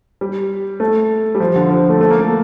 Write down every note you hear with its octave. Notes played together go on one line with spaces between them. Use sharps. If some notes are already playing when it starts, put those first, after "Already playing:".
G3
A3
G3
F3
D3
F3
A3
A3
A#3
A3